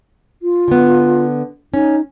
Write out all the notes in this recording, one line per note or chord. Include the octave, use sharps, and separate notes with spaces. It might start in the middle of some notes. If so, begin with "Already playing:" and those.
F4
D3 B3
C#4 D#4